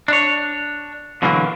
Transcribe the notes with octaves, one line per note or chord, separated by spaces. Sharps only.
D4 C#5
B2 D3 E3 F#3 A3 A#3